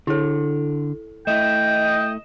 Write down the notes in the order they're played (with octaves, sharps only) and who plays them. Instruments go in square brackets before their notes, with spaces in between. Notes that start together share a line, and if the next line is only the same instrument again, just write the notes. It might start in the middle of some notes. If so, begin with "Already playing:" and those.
[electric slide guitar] D3 [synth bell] E4 A4
[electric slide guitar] A3 E4 [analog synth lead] D#5 [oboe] G5 [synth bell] E7